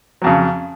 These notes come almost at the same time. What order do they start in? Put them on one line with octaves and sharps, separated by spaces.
F#3 F2 C#3